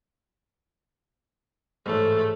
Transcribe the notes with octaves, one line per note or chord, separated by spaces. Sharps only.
A1 G#2 A3